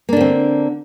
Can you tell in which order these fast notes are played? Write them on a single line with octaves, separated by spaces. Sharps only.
A#3 D4 D3 C4